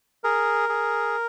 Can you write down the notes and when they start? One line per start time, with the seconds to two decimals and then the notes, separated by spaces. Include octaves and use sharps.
0.24 G#4 A#4
0.69 G#4